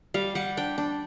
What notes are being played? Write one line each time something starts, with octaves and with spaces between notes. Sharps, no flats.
G3 F5
G3 F#5
D4 G5
D4